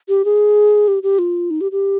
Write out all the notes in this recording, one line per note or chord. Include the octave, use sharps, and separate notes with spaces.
G4
G#4
G4
G4
F4
D#4
G4
G4